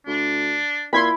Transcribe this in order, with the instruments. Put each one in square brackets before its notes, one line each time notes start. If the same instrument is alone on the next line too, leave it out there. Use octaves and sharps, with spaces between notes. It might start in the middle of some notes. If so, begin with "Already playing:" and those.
[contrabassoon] D2 [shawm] D4
[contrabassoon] A#2 [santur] E4 B5 [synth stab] C6 G#6 B6